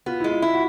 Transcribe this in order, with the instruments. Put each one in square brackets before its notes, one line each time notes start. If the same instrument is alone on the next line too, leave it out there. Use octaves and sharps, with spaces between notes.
[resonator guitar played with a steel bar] B3 [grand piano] F4
[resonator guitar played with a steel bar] G#3 [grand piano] E4
[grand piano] F4
[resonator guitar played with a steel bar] E4
[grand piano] F#4